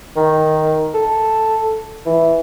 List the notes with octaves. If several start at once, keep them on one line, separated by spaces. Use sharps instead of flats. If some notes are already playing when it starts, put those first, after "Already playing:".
D#3
A4
E3